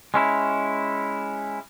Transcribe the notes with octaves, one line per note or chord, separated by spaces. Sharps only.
G#3 C#4 E4